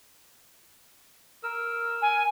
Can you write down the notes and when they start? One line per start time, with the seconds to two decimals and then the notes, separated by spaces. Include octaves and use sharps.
1.43 A#4 E6
2.02 G#5